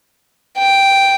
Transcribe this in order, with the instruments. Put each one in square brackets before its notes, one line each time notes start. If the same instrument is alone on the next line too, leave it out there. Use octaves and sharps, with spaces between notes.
[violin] G5